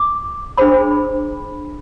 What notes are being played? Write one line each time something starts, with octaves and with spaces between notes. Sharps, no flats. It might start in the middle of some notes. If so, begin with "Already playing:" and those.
Already playing: D6
D4 G#4 C5 B5